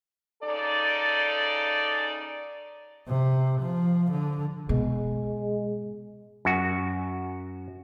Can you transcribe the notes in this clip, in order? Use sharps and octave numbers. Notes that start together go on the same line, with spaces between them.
C#3 D#4 A4 D5
C3
F3
D3
B2 G#3
F#2 F#4